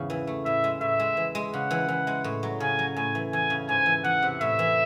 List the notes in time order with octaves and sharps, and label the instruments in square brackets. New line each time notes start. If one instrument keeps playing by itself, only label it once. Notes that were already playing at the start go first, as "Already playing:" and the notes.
Already playing: [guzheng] E2 G#2 C#3
E3
A3
[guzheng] A2 [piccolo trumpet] E5
[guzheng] G#3
[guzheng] A2 [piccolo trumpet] E5
[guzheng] G#3
E3
G#3
[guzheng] C#3 [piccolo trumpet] F#5
[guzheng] E3
E3
G#3
A2
F#3
[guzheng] C#3 [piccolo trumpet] G#5
[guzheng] F#3
[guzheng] A2 [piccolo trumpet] G#5
[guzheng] E3
[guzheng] E2 [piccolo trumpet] G#5
[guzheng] C#3
[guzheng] G#2 [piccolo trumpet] G#5
[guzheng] E3
[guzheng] E2 [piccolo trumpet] F#5
[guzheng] C3
[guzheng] A2 [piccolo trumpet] E5
[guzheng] E3